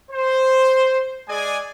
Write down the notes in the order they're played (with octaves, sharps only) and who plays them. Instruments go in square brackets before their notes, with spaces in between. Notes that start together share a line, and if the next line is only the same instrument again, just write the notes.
[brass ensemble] C5
G#3 G#4 D5 G#5